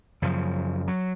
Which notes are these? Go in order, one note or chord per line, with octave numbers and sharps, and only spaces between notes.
F#2 C#3 F3
F#3